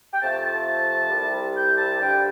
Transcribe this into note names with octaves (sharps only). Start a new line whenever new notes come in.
G5
F2 C3 F3 A3 A5
A5
C2 C3 G3
G5
A5
G2 D3 G3 G5